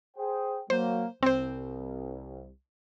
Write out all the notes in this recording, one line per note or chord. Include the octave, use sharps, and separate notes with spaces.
G#4 C5 G5
F#3 A#3 C5
C2 C4 C5